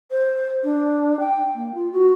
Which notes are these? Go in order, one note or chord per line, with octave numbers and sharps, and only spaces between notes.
C5
D4
G5
A#3
F4
F#4